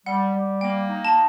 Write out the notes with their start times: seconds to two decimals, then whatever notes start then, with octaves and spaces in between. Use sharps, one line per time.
0.06 G3 F#5
0.35 G3
0.61 A#3 G5
0.89 D#4
1.05 A5